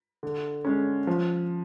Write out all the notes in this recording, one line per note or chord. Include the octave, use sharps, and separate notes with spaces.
D3
G#3 C#4
F3